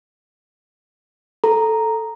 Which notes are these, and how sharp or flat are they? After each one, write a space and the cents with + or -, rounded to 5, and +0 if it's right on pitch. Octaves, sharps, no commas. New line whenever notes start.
A4 +0 A#5 +0